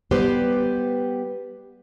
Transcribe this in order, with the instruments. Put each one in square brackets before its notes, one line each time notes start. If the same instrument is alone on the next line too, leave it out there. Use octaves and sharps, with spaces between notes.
[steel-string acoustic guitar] G3 B3 G4 B4 C5